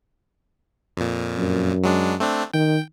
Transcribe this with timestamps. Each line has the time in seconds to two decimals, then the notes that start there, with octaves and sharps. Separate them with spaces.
0.97 F2 A#2
1.38 F#2
1.84 F#3 G#3 D4
2.20 A3 C4 D4
2.54 D#3 G5